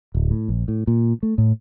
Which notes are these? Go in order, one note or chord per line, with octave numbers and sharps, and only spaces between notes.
D1
A2
A#1
A2
A#2
A3
A2